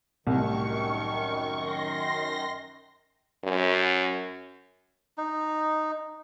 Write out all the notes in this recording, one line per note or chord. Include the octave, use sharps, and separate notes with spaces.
C2 F#2 A2 D#3 C#6
C6 A#6
F#2
D#4